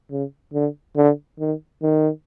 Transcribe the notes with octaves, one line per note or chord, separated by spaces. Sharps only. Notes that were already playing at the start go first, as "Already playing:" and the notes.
C#3
D3
D3
D#3
D#3